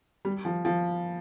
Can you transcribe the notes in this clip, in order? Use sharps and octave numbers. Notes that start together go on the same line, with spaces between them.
G3
F3
F3